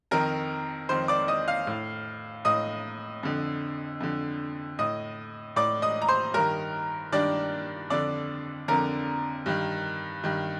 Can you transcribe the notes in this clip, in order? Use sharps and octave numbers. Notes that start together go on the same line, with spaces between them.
F2 D#3 A#4 A#5
F2 D#3 C5 C6
D5 D6
D#5 D#6
F5 F6
A2
A2 D#5 D#6
F2 D3
F2 D3
A2 D#5 D#6
A2 D5 D6
D#5 D#6
A#5
C5 C6
G2 D#3 A#4 A#5
G2 D#3 D4 D5
F2 D3 D4 D5
F2 D3 A#4 A#5
G2 D#3
G2 D#3